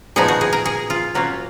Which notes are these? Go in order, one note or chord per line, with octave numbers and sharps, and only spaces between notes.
A#2 F3 B3 D#4 G#4
F#4
G#4
A#4
G#4
F4
F#3 A#3 C#4 F4 F#4